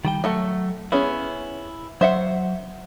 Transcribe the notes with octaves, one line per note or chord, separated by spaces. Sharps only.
D#3 G3 G5
F#3 A3 A4 F#5
B3 C#4 E4 G#4
F#3 C5 E5 F#5